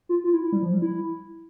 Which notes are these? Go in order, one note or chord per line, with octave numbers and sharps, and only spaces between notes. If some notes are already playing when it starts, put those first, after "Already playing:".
F4
F4
E4
E4
G3
F3
G3
E4